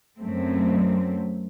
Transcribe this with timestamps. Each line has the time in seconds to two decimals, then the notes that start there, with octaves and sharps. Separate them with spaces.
0.19 F#2 F#3 A3 C4